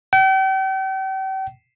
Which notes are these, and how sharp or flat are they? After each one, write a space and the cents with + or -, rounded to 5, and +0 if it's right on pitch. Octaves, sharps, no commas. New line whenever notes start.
G5 -40